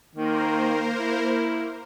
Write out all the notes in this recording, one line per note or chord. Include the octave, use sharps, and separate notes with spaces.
D#3 A#3 A#4 C5
E4